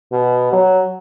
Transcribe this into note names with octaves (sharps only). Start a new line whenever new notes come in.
B2
F#3